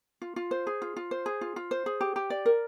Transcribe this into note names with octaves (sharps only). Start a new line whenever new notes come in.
F4
F4
C5
G#4
F4
F4
C5
G#4
F4
F4
C5
G#4
G4
G4
D5
A#4